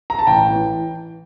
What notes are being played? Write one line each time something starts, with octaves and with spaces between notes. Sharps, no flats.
A#5
A5
A1 G5
E3